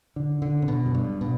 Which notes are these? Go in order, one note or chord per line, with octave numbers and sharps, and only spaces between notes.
D3
D3
C3
B2
F#2
G2
B2